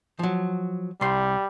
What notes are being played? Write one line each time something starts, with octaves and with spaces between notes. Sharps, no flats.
F3 F#3
C2 G3 C6